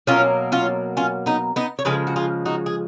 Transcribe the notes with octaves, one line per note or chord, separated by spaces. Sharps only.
B2 F#3 A#3 C#4 F4
C#4 F4
C#4 F4
B3 D#4
B3 D#4
C#5
C#3 F3 G#3 G#4 B4
F#4
F4 G#4
D#4 F#4
G#4